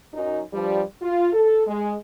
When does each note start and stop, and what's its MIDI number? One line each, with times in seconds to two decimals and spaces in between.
0.14 0.41 42
0.14 0.41 63
0.53 0.83 43
0.53 0.83 53
0.53 0.83 55
1.02 1.30 65
1.33 1.64 69
1.67 1.95 56